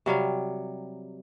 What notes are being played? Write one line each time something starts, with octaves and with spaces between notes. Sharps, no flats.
C3 F#3 G3 F5